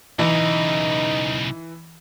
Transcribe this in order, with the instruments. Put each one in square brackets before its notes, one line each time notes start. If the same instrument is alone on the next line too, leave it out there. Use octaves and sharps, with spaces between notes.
[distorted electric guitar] B1 C#3 [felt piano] E3 [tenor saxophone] D#4